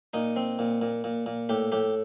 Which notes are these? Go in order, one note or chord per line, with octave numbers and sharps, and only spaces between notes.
A#2 D#4
C4
A#2
A#2
A#2
A#2
A2 G4
A2 G4